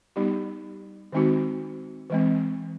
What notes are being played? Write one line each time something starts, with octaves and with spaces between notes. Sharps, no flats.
G3 B3 D#4 G4
D#3 G#3 C4 D#4 F#4
E3 G#3 C4